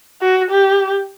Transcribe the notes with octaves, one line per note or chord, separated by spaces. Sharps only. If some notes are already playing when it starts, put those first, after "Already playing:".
F#4
G4